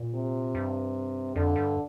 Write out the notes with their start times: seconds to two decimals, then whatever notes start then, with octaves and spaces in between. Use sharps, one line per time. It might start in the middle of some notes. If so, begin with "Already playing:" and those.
Already playing: A#2
0.14 C3
0.55 G2
1.36 F2 D3
1.56 G2